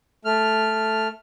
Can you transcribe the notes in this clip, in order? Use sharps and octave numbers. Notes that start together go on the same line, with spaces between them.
A3 F6